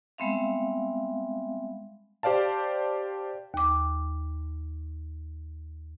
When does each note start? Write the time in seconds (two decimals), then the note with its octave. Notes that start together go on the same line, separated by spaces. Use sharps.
0.18 G3 G#3 B3 C4 E5 F5
2.23 G4 C5 D5 F5 A5
3.54 D#2 D6